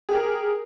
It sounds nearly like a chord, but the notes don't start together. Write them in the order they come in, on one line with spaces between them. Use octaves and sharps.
G#4 G4 A#4